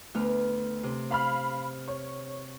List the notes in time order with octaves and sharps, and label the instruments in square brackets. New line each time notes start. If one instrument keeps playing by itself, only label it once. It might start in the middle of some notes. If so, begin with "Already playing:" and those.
[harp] D2 B3 F6
C3
[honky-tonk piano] F5 B5 F6
C#5